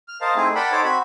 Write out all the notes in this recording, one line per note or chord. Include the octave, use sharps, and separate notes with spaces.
F6
A#4 C5 D#5 F5 A5
A3 C4 D#4 E4 G#4
A#4 D5 F#5 G5 A5 B5
D#4 A4 C5 C#5 A5 D6
C4 F#4 B5